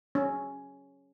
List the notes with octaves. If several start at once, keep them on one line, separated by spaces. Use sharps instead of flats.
C#4